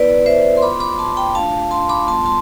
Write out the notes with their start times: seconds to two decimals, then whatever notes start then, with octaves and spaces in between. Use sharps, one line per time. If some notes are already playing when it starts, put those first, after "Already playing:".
Already playing: B3 E4 B4 D5
0.26 C5 E5
0.57 C6
0.62 B3 F4 B5 D6
0.80 B5 D6
0.99 A5 C6
1.17 G5 B5
1.35 A3 D4 F4 F5 A5
1.71 A5 C6
1.89 B5 D6
2.08 G3 B3 F4 A5 C6
2.26 A5 C6